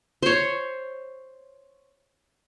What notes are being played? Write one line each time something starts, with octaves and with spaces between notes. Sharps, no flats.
C5 C#5